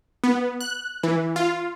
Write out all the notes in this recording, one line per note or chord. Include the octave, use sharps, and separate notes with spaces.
B3
F#6
E3
F4